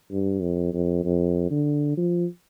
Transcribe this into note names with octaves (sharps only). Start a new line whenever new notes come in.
G2
F2
F2
F2
D3
F3